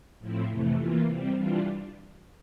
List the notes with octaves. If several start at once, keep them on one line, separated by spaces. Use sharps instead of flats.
A2 F3 C4 E4
F2 C3 E3 A3
E3 A#3 F4
C3 G3 C4
E3 G3 D4 F4